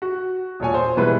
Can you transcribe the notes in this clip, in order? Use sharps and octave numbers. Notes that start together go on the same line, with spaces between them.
F#4
E1 A#2 C#5 G#5
C5
B2 E3 G3 G#3 E4 B4